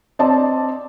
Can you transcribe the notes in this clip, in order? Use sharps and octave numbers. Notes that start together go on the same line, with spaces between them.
C4 D5 D#5 A5